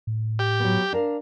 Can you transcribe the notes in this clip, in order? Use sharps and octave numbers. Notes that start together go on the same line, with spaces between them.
A2
G4
F#3 B3
D4 A#4 F5